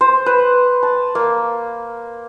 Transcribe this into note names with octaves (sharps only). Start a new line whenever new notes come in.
C5
B4
A5
A#3